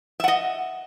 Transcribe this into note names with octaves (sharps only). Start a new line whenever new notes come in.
D#5 E5 F#5